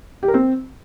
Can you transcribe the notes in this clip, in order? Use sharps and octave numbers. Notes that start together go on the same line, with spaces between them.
G4
A#4
C4